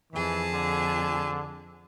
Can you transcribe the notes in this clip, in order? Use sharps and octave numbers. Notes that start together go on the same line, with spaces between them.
F2 E3 G#4 A5
D3